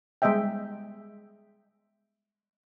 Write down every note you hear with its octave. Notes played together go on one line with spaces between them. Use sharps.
G3 G#3 B3 D#5 E5 G5